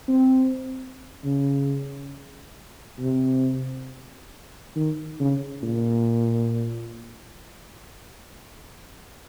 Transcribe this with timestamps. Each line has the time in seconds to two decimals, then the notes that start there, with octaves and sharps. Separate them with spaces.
0.08 C4
1.25 C#3
3.00 C3
4.76 D#3
5.20 C#3
5.63 A#2